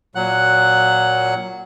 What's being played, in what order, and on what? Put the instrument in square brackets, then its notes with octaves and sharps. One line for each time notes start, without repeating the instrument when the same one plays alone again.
[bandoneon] A#2 F#3 F#5 F#6